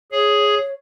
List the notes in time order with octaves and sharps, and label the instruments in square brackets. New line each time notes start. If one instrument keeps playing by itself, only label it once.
[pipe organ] G#4 [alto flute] C#5